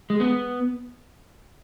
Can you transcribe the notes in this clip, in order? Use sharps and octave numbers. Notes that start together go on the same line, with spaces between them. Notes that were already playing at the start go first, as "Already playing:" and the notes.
G#3
B3